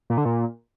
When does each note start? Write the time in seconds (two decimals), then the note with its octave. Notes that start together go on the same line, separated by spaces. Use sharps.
0.10 A#2
0.18 D3
0.25 A#2